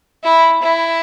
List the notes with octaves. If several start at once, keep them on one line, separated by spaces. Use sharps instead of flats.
E4
E4